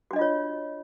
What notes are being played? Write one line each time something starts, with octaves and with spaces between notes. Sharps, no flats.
D4 F4 F#4 C#5 D#5